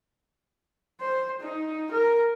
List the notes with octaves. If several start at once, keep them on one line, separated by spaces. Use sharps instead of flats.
C5
D#4
A#4